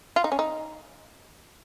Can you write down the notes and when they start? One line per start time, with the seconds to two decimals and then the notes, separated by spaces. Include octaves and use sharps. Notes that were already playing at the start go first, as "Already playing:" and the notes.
0.16 F4
0.24 D#4
0.32 C#4
0.39 D#4